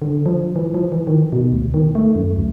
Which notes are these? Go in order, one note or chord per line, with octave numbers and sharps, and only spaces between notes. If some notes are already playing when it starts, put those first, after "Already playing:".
D3
F3
E3
F3
E3
D#3
B2
D2
D#3
A3
F#2
D2